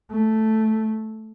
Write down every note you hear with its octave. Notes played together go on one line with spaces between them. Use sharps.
A3